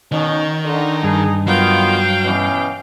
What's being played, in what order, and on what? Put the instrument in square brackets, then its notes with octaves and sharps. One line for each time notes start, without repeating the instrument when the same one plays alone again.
[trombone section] B2 C#4 D#4 [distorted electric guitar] D#3
[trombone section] D3 [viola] D#4
[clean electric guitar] G2 [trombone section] G#4
[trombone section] D#3 B3 F4 [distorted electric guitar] F#3 [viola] F5 G5
[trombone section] B2 E3 C#4